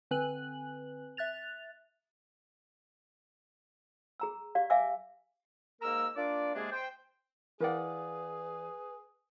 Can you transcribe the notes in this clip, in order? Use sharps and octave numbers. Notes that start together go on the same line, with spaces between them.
D3 C4 B4 G#5 F#6 F#7
E5 F#6 A6 F7
G#4 A#5 E6
G4 D5 F5
E5 F5 G#5 D6 E6
G#2 A#3 A#4 A#5 E6
A#3 D4 F4 D5
C3 G#3 A#3 D4 G#4
C5 G5
E3 G#4 A#4 B4 D5 F5 F#5